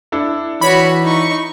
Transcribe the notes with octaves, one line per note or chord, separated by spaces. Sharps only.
D4 E4 A4
E3 F#4 C#5 B5
D#4 C#6